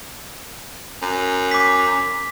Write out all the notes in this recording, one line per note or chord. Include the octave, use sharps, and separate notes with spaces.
F#2
D6 B6